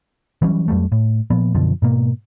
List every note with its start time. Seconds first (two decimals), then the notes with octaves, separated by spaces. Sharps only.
0.42 E3 F#3 G3 C#4
0.68 F2 F#3 G3 A3
0.92 A2
1.30 A#2 F3 B3
1.55 F#2 B2 D3 F3
1.82 G#2 B2 A#3